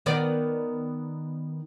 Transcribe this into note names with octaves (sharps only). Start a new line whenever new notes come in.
D#3 B3 D5